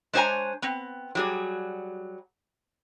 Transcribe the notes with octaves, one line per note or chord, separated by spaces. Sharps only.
G#3 D4 C5 C#5 G#5 A#5
B3 C4
F#3 G3 G#4